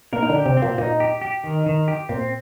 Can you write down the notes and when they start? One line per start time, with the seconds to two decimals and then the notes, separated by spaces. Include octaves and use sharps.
0.13 A#2 A#3 A#4
0.23 D#4
0.29 D3 D4
0.35 G4
0.46 C3 C4
0.57 C4
0.62 A#2 A#3
0.78 A#2 A#3 D#4
1.00 G4
1.21 G4
1.44 D#3
1.66 D#3
1.88 G4
2.09 A#2 A#3 C4